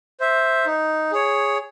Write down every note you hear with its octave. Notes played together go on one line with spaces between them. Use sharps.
C5 E5
D#4
G#4 C#5